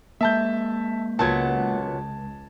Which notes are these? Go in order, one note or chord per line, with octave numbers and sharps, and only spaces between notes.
G#3 A#3 E5 A5 G6
C#2 A#2 F#3 B3 A5 G#6